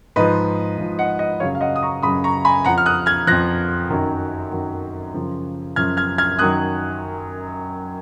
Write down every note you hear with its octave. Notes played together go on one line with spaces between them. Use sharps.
G#2 F3 B4 D#5
G#2 F3
D#5 F#5
D#5 F#5
F#2 C#3 F#3 C#5 F5
F5
D#5 F#5
D#6
A#5 C#6
F#2 C#3 F#3 B5 D#6
A#5 C#6
G#5 B5
F2 F3 F#5 A#5
F6
D#6 F#6
F6 G#6
F2 F3 F#6 A#6
F#2 D#3 F#3
F#2 D#3 F#3
F#2 C#3 F3
F#2 C#3 F3 F6 G#6
F6 G#6
F6 G#6
F#2 D#3 F#3 D#6 F#6